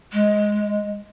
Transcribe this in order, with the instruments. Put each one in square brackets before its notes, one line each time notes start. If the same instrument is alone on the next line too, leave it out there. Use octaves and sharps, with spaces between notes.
[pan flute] G#3